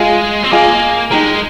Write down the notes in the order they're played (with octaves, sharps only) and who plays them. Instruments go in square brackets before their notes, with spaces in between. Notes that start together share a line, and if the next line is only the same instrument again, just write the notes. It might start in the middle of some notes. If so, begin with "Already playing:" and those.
Already playing: [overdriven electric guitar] G#3 [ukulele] F4 G#4 D#5 G#5
[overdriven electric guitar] C4
[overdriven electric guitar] A#3 [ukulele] F4 G#4 D#5 G#5
[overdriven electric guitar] G#3 [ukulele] D#4 G4 A#4